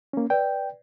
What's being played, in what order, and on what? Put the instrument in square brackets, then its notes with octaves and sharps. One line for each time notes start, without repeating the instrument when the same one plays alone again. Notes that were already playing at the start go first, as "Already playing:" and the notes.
[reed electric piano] A#3 C#4
[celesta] B4 D5 [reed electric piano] G5